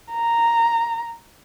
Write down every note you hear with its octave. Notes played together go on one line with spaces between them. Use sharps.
A#5